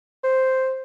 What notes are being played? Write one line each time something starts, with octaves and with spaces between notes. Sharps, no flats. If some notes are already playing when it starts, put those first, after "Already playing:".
C5